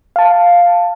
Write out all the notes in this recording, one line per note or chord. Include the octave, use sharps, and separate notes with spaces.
F5 A5